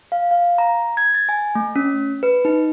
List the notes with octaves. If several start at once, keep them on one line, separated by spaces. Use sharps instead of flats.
F5
F5
A#5
G#6
A6
G#5
A3
C#4
B4
D#4